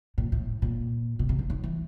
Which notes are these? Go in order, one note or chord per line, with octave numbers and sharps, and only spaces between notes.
A#2
A2
A#2
B2
C3
D3
D#3
E3